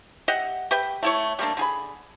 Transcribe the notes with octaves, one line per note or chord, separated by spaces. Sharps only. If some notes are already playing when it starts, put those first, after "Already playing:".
G4 D#5 E5 F#5
G4 B4 E5 G5
A3 E4 C#5
G3 A3 A#3 D4
D3 G#4 B5